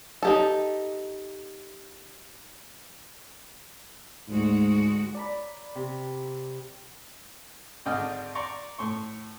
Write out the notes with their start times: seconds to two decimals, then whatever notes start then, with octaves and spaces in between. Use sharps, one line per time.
0.23 D#4 G4 A4
4.29 D2 G#2 G#3 F#4
5.15 D5 A#5 B5
5.75 C3
7.86 G#1 D3 D4 D#5 G5 F6
8.35 D5 A#5 C6 C#6
8.78 A2 C6 C#6